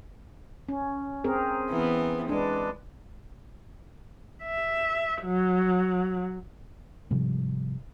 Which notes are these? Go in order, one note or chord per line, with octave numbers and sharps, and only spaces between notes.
C#4
C4 G#4 A#4
E3 B3
G#3 D4 B4
E5
F#3
G#2 C3 F3 G3